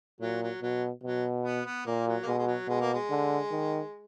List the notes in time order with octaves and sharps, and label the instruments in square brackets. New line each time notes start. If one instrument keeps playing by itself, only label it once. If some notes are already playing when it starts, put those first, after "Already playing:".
[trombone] A#2 [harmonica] F#3
[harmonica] F#3
[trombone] B2 [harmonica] F#3
[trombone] B2 [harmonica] F#3
[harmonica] B3
B3
[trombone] A#2 [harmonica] A#3
[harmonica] F#3
A#3
[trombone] B2 [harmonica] G#3
[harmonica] G#3
F#3
[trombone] B2 [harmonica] G#3
[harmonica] A#3
G#3
[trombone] D3
D#3